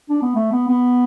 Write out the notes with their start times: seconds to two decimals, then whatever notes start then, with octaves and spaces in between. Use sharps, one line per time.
0.09 D4
0.22 B3
0.35 A3
0.52 B3
0.68 B3